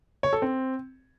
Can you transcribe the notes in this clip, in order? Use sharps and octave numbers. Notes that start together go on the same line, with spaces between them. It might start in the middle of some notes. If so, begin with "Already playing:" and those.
C#5
A4
C4